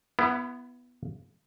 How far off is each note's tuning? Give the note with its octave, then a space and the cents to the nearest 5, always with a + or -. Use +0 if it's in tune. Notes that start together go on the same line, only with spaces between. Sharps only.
B3 +0 E4 +35